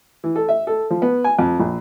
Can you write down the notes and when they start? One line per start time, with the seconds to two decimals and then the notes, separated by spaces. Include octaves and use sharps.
0.24 E3
0.36 A4
0.49 E5
0.67 A4
0.90 F3
1.02 B3
1.24 G#5
1.39 F2
1.59 A#1